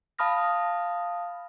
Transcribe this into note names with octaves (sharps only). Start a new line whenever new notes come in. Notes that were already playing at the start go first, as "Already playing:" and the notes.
F5 A5 B5 D#6 F6 A#6